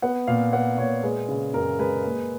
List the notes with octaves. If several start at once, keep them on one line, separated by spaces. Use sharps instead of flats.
B3 F#5
A#2 F5
B3 F#5
A#2 C#5
G#3 B4
C#3
F#2 A#4
G#3 B4
A#3